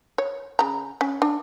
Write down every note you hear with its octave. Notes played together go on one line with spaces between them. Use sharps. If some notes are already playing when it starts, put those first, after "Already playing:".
C#5
C#3 A#5
C#4
D4